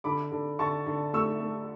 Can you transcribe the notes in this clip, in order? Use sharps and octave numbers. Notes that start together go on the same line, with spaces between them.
D3 B5 D6
D3
D3 A5 C#6
D3
A3 C#6 E6
A3